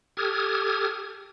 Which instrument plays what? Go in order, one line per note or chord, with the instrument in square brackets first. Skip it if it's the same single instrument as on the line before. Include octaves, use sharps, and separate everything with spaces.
[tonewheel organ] G4 A4 D#6 F6 G#6